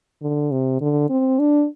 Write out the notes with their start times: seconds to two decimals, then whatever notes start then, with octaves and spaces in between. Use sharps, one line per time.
0.22 D3
0.51 C3
0.81 D3
1.10 C4
1.39 D4